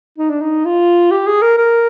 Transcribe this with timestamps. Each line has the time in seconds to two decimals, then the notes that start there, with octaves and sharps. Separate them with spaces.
0.18 D#4
0.30 D4
0.41 D#4
0.65 F4
1.11 G4
1.27 G#4
1.42 A#4
1.58 A#4